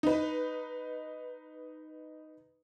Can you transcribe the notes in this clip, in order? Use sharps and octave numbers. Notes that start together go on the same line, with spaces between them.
D#4 B4